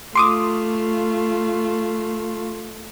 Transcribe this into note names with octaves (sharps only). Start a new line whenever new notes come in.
A3 F4 C6 D6 D#6